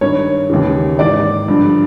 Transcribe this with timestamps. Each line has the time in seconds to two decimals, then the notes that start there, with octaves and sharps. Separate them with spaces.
0.01 G2 D#3 C#5
0.50 D#2 C#3 E3
0.99 G#2 E3 D5
1.48 G2 D3 F3